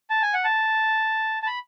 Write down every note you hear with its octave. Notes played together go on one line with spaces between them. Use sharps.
A5
G#5
F#5
A5
A5
B5